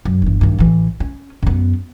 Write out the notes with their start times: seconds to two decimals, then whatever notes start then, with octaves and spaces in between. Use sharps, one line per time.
0.05 F#2
0.22 G1 E3
0.41 G2 D#3
0.59 A1 E3
1.00 C#4
1.43 F#2 B3